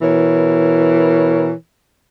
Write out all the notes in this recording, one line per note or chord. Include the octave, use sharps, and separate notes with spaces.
B2 E3 A#4 C#5